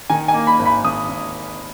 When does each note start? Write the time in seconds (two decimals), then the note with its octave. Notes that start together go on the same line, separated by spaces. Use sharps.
0.10 D#3 G#5
0.28 G#5
0.34 A#3
0.47 B5
0.59 G#1
0.65 B5
0.84 G#1 D#6
1.09 G#1